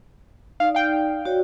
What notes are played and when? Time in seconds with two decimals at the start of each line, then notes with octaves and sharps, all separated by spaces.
0.60 D#4 D5 F5
0.75 F5 G5
1.25 F#4 C#5 D5